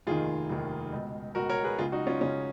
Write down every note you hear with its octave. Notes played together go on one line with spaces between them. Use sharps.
F1 D#2 D#3 F4 G#4
F1 D#2 D#3
C#2 B2
C#2 B2 F#4 A#4
A#4 C#5
G#4 B4
C#2 C#3 F4 G#4
D#4 F#4
C#4 F4
C#2 C#3 C#4